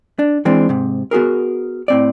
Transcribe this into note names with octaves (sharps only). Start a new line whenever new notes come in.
D4
E3 G#3 C4 D4
G#2 C3
B3 F#4 G#4 A#4
A2 C4 D5